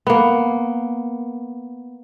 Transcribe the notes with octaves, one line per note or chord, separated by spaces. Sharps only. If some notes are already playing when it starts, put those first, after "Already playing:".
A#3 B3